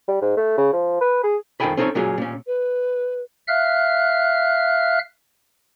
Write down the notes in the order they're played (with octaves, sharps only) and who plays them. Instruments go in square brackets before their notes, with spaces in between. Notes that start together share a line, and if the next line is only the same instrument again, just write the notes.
[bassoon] G3
G#2
A3
C#3
F3
B4
G#4
[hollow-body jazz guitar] F2 D#3 A4 G5 G#5 B5
C4 C#4 D#4 A4 B4 C#5
A#2 F#3 C#4 G#4
A#2 C#4
[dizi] B4
[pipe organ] E5 F5 F6 F#6